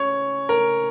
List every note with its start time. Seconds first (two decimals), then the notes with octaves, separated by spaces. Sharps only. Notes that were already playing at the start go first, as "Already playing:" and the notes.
Already playing: C#3 C#5
0.49 A#4